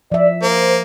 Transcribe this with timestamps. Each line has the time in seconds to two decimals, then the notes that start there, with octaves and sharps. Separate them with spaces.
0.12 F3 D5 E5
0.43 A#3 C5